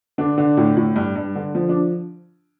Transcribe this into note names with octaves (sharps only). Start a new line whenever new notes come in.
D3 D4
D3
A2
A2
G2
G2
D3
F3
D4